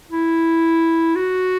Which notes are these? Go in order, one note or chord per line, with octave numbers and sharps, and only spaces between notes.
E4
F#4